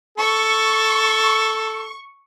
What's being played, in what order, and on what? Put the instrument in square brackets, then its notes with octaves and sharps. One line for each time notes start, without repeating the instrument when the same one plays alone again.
[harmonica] A4 [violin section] C#6